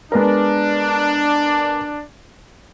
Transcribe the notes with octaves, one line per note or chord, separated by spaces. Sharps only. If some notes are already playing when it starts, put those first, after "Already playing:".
G#3 B3 D4 A#4